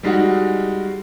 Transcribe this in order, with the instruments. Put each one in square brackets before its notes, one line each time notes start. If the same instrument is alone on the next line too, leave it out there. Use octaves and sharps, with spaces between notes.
[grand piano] G3 G#3 D#4 F#4